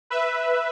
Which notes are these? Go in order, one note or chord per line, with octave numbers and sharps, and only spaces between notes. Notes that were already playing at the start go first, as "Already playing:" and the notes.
B4 E5